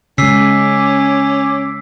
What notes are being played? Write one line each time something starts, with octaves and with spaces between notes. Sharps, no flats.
C#3 G#3 C#4 D6 E6 B6 C7